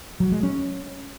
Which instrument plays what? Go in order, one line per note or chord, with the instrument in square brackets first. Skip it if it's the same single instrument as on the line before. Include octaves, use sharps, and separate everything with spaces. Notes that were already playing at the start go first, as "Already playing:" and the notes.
[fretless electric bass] F#3
G#3
C#4